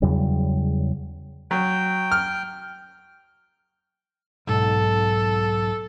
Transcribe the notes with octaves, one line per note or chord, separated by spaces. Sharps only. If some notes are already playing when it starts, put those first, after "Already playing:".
E2 C#3 F#3 G3
F#3 G5
F6
B1 G#2 A4